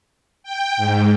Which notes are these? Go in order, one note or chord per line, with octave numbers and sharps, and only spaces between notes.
G5
G#2